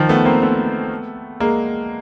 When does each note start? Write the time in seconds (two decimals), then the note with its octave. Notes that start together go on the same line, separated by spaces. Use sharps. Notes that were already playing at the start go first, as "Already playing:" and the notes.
Already playing: D#3 F3
0.09 A3 B3
0.25 A#3 C4
0.42 A3 B3
1.40 G#3 A#3